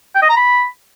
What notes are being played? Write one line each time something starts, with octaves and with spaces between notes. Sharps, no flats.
G5
D#5
A#5
B5